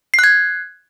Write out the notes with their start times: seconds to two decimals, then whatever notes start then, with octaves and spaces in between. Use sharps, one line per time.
0.14 C7
0.19 F#6
0.24 G#6